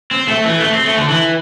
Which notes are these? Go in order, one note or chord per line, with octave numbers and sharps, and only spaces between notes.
C4
A3
E3
A3
C4
A3
D3
E3